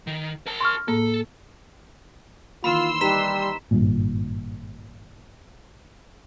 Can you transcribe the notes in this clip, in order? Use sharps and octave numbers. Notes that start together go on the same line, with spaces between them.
D#3
A#4 A5
C6 C#6 F6
A2 A#3 A4
D#3 E3 A#3 F4 B5 C6 E6
G3 D#4 G4 B4 A#5 B6 E7
G#1 G2 A#2